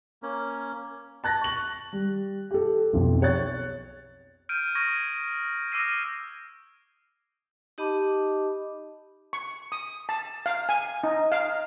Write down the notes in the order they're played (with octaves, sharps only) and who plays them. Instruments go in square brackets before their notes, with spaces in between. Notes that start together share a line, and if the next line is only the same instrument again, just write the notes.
[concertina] A#3 C#4
[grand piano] A5 F#6 A6 A#6
C#6 F#7
G3
G4 A4
B1 F2
C#5 F#6 A6
[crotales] F6 G6 D7 D#7
C#6 D#6 F6 G#6 A#6 D#7
D6 E6 F6 A#6 C7 D#7
[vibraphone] D#4 G4 D#5 A5 B5 D6
[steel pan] C#6
D#6
A5
F5
G#5
D#4
F5